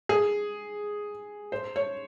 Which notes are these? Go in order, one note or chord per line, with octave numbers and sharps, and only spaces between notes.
G#4
C5
C#5